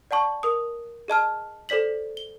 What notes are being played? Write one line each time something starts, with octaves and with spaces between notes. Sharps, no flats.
D5 F#5 A5 C#6
A#4 D#6
G#4 D#5 A5 F6
A4 C5 D5 B6 F#7
G7